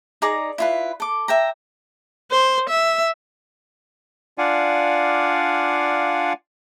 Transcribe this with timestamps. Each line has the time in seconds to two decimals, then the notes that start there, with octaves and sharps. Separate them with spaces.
0.22 D#4 G#4 D5 A#5
0.58 E4 F4 B4
1.00 A4 D6
1.28 E5 G5 A#5
2.31 C5
2.69 E5
4.38 D4 F4 D5 F5 F#5 G#5